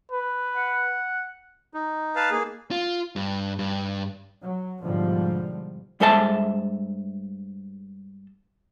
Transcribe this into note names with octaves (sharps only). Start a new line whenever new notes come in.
B4
F#5
D#4
B4 F5 A5
A#3 G#4
F4
G2
G2
F#3
G#2 B2 D3 F3 G3
G2 G#3 A4 C5 E5 A5